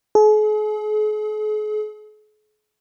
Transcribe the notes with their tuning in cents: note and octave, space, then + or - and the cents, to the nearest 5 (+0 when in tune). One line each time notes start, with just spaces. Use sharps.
G#4 +45